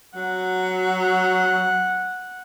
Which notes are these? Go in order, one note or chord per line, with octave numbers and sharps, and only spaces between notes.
F#3 F#5